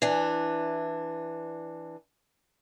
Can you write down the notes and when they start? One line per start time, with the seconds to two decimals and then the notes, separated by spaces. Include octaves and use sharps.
0.02 E3 D4